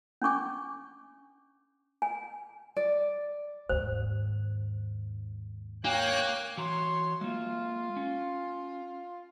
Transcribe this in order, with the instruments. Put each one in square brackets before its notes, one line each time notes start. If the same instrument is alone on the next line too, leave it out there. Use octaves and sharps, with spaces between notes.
[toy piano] C#4 D4 C#6 D6
G#5
[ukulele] D5
[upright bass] D#2 G#2 [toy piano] C5
[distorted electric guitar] A#3 [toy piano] D4 [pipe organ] C#5 G5 F#6
[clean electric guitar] E3 F#4 A#5 [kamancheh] C#5 C6
[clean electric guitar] G#3 A#3 [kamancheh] F4
[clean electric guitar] C#4